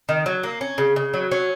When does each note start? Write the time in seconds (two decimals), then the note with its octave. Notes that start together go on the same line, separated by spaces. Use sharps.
0.09 D#3
0.26 F#3
0.43 A#3
0.61 C#4
0.78 C#3
0.96 C#3
1.14 F#3
1.32 C#4